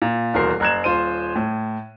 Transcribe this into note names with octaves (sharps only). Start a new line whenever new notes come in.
A#2
D#1 E2 B2 A#4 C5 C7
F#1 A#5 F#6 G#6 E7
D#1 F4 C5 D#7
A2